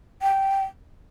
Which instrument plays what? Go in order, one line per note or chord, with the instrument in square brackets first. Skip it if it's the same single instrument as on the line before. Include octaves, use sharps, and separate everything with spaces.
[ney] G5